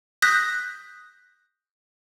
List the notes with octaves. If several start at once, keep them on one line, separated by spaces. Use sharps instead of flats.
D#6 F#6 G6 A#6 B6